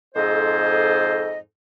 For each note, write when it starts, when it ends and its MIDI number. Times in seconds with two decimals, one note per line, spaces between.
0.15 1.38 41
0.15 1.38 44
0.15 1.38 68
0.15 1.38 69
0.15 1.38 72
0.15 1.38 75